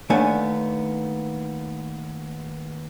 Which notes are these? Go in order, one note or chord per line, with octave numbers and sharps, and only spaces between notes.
D#2 A3 B3 D4 G#5